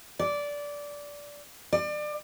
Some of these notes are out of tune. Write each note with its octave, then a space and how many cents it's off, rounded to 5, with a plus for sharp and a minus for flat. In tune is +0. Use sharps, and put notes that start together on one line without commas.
D5 -15
D5 +30